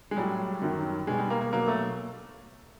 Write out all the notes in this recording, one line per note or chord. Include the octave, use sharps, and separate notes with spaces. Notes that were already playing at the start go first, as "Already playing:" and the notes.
G#3
A2 F#3 G3
F#2 D#3 F#3
B2 G3 G#3
G3
A#3
A#3
B2 F#3 A#3
A3